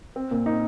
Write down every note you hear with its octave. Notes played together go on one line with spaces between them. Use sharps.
C4
A#2
D#4